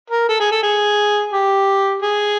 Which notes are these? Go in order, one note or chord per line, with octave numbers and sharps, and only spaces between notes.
A#4
A4
G#4
A4
G#4
G4
G#4